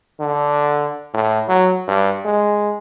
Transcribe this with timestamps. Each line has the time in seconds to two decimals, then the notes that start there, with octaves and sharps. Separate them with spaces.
0.20 D3
1.14 A2
1.48 F#3
1.88 G2
2.25 G#3